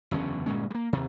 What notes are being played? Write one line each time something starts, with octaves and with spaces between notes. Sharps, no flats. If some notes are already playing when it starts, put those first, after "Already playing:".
F#1 E2 D3 C#4
G1 A#2 G#3 C#4
G3 A#3
D#2 C3